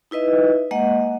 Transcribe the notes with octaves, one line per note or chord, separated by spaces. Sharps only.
D#4 E4 B4 D#5 E5
G#3 A#3 D#5 F#5